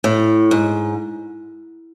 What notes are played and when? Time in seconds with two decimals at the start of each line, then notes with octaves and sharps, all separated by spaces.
0.04 A2
0.51 G#2